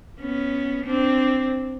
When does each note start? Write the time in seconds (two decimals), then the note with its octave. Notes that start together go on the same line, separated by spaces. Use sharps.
0.21 B3 C#4
0.86 C4 D4